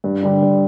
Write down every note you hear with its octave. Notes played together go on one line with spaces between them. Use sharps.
G2
D3 G3
G2